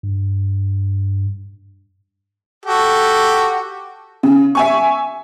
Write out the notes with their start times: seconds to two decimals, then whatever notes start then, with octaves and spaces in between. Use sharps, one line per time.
0.03 G2
2.66 F#4 G4 A4
4.23 C#3
4.55 E5 G#5 C#6